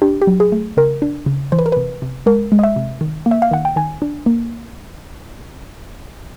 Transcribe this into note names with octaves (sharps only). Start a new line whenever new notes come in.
D4 G4
G4
F#3
G#4
A3
C#3 A#4
D4
C#3
E3 C5
B4
A#4
C3 B4
C3
G#3 A#4
G#3
D#5
E5
C3
D#3
A#3
E5
F5
D#3 F#5
G5
D#3 G#5
D4
A#3